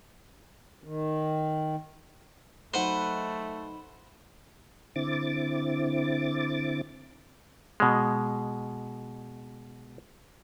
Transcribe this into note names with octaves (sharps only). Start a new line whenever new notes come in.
D#3
F#3 A3 D#4 B4 C5 D#5 F#5
D3 C4 E4 D6 A6
B2 G#3